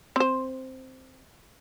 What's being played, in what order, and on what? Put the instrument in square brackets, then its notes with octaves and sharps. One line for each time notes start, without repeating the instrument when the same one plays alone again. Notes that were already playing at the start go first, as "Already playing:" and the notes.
[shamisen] C4 C5